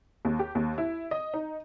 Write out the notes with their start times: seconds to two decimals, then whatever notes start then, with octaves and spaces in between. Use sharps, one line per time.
0.25 D#2
0.39 G4
0.55 D#2
0.78 E4
1.11 D#5
1.34 D#4